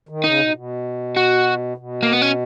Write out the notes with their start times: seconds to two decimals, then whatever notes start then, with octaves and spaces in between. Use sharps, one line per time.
0.09 D#3
0.24 C#3 D#4
0.39 B2
0.50 A#2
0.54 B2
1.17 F#4
1.77 B2
2.03 A#3
2.12 B3
2.22 C#4